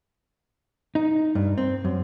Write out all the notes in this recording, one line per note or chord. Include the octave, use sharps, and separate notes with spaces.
D#4
G2
C4
F#2